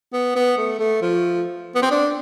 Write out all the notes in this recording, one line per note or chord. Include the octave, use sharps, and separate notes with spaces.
B3
B3
A3
A3
F3
B3
C4
D4